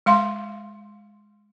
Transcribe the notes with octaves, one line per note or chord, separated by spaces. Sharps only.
G#3 F5 C6